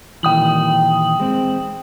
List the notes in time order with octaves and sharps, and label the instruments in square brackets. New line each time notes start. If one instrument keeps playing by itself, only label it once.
[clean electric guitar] A#2 D#3 E3 [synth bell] G5 D#6 F#7
[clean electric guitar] G#3 C4